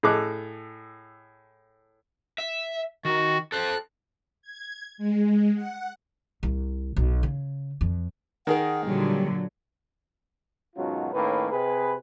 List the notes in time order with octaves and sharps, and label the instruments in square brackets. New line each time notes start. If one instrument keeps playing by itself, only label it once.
[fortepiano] A2 G#4 A4 D#5 D6 F#6
[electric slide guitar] E5
[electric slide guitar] D#3 [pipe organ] F#4
[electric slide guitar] A4 C5 [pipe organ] F#6
[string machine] G#6
G#3
F#5
[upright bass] C2
B1
C#3
F2
[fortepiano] D#3 G#4 A#4 [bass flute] F#5
[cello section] A#2 D3 F#3 [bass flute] G3
[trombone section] G#2 B2 D#3 F#3 C#4 F4
A2 D#3 A#3 C#4 B4
C3 G#4 B4